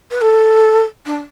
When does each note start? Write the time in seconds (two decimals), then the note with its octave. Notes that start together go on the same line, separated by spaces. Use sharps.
0.11 B4
0.21 A4
1.06 D4